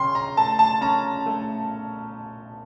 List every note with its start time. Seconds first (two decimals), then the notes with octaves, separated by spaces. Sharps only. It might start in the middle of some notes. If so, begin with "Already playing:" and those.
Already playing: C#3 C#4 G5 C6
0.15 A#5
0.37 A3 A5
0.59 A5
0.81 C#4 A#5
1.26 A3